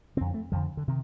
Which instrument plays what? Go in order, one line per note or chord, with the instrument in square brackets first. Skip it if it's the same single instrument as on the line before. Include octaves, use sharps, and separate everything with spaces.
[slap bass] D3 C4
F2
A3
F2 D3 F3
D3
C3 D#3